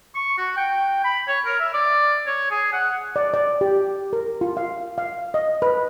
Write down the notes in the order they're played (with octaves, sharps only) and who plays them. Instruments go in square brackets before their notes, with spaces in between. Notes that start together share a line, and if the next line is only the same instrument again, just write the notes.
[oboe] C#6
F#4
G5
B5
C#5
A#4
E5
D5
C#5
G#4
F#5
[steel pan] D5
D5
G4
A#4
F4
F5
F5
D#5
B4